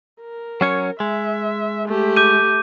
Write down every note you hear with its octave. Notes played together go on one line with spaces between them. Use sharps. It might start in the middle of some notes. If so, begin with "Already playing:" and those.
A#4
F#3 C#4 C#5
G#3 E5
A3 G4
D6 G6 D#7